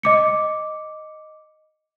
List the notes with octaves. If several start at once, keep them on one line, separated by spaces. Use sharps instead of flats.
D#5 D6 C#7